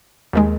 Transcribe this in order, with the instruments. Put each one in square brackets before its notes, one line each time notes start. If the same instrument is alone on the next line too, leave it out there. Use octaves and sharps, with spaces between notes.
[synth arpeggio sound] D#2 D#3 G#3